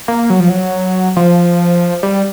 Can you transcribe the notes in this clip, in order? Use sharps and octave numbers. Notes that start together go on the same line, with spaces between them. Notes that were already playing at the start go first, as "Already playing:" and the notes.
A#3
F#3
F3
F#3
F3
G3